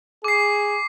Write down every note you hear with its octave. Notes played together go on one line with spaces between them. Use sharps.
G#4 D6 C7